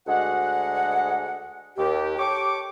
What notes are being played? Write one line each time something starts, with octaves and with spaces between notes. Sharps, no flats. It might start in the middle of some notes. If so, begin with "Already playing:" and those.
D2 G#3 F#5
D#2 G4
G4 A4 C#5 G5 C#6 D6